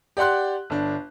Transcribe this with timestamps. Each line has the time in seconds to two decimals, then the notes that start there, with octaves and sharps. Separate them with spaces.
0.17 G4 D5 F#5 C6 F#6
0.70 G1 D4